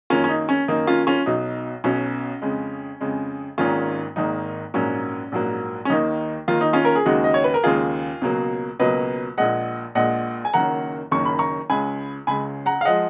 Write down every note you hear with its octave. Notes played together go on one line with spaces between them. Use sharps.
F#2 D#3 A#3 C#4 F4
C#4
D#4
C#4
F#2 D#3 A#3 D#4
C#4 F4
C#4 F4
B1 B2 F#3 D#4
B1 B2 F#3 C#4
F2 C#3 G#3
F2 C#3 G#3
G#1 G#2 D#3 A#3 C#4 F4
G#1 G#2 D#3 A#3 D#4
A#1 G#2 F#3 A#3 C#4
A#1 G#2 F#3 A#3
C#4
D#2 D#3 A#3 D#4
D#2 D#3 A#3 F4
D#4
C#4 F4
A#4
G#4
D#2 C#3 G#3 D#4 F#4
D#5
C#5
B4
A#4
D#2 C#3 G#3 F4 G#4
C#2 B2 F#3 A#3
C#2 B2 F#3 A#3 B4 D#5
A#1 A#2 G#3 D#5 F#5
A#1 A#2 G#3 D#5 F#5
G#5
F#1 F#2 D#3 A#3 F#5 A#5
F#1 F#2 D#3 A#3 C#6
B5
A#5 C#6
C#2 C#3 G#3 G#5 B5
C#2 C#3 G#3 G#5 B5
F#5 A#5
F5
F3 G#3 D#5 F#5